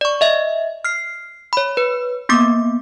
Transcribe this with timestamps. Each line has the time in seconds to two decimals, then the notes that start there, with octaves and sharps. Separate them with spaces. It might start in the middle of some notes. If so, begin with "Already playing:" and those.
0.01 D5 C#6
0.21 D#5 E5
0.85 F6 C7
1.53 C#5 B5
1.77 B4
2.29 A#3 B3 D6